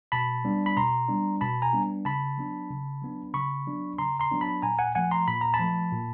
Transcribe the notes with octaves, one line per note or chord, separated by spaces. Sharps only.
B2 A5 B5
G3 B3 D4
B5
B2 A#5 C6
G3 B3 D4
B2 A5 B5
G#5 A#5
G3 B3 D4
C#3 A5 B5
F#3 B3 D4
C#3
F#3 B3 D4
C#3 B5 C#6
F#3 B3 D4
C#3 A#5 C6
A#5 C6
F#3 B3 D4
A5 B5
A#2 G#5 A#5
F#5 G#5
F3 A3 F#5 G#5
A#5 C6
A#2 B5
A#5
A5 B5
F3 A3
A#2